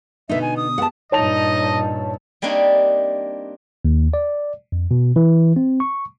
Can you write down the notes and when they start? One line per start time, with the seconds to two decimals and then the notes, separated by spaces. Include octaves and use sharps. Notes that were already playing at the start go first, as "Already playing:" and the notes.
0.29 B2 D3 B3 D#4 E5
0.42 G#5
0.57 D#6
0.78 G#3 B3 G4 F#5 A5
1.12 G2 A#2 D#4 C#5 D#5 A5 F7
2.42 G3 A#3 C4 D4 D#4 C#5
3.85 D#2
4.14 D5
4.72 F2
4.91 B2
5.16 E3
5.56 C4
5.80 C#6